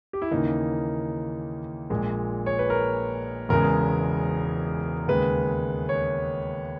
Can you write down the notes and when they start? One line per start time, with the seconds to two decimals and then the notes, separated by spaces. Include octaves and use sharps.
0.13 G4
0.22 E4
0.31 D#2 C#3 E3 A#3 D#4
1.90 A#1 A#2 G#3
2.46 C#5
2.59 B4
2.70 A#4
3.49 E1 E2 C#3 G#3 A#4
5.08 D#2 C#3 G#3 B4
5.89 C#5